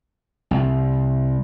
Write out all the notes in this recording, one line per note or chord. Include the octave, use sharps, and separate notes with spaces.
C2